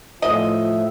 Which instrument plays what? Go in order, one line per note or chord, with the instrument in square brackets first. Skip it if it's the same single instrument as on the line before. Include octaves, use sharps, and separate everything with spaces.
[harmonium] A2 E5 [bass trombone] F3 [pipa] D#5